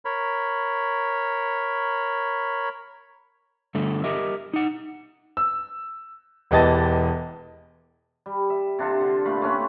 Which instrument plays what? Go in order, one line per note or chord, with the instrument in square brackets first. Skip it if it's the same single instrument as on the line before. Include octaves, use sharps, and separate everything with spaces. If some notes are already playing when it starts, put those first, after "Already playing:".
[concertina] A#4 C#5 B5
[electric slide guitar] G2 D3 A3
G4 A#4 D#5 E5
D#4 F#5
[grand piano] E6
E1 E3 G4 D#5 A5 A6
[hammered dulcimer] G3
E5
C3 D4 F4 A4
D3
A#2 A3 F4 B5
A3 C4 C#4 B4